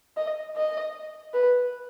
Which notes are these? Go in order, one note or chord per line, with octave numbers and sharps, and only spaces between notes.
D#5
D#5
B4